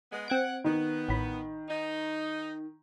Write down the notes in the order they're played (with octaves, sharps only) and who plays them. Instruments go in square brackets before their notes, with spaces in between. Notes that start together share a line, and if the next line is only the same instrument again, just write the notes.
[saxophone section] G#3 B3
[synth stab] C4 G#6 D7 [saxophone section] F#5
[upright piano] D#3 [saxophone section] B3
[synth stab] A1 B5
[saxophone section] D#4